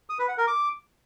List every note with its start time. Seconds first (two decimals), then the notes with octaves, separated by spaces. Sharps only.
0.10 D#6
0.19 B4
0.29 F#5
0.38 A#4
0.47 D6